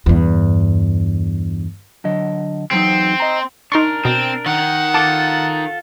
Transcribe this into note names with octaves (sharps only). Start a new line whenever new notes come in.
E2 G2
D3 F#3 D#5
E2 F#3 C4 D#4
D#5 A#5
D4 D#4 A#4 C6 C#6
B2 C4
D#3 F#5
F4 A4 A5 D6